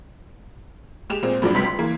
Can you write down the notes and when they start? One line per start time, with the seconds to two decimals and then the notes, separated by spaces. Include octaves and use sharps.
1.10 G#3 G4 E7 F7
1.23 A#2 G#3 C4
1.42 F#2 A2 F3 F#3 D4
1.54 C#2 C3 F#3 B4 C6 B6
1.66 C6
1.79 E3 A#3